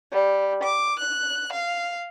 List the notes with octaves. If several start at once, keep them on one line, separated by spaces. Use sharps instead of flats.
G3
D6
F#6
F5